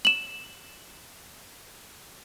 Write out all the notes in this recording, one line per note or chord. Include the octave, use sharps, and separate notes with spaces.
E7 F#7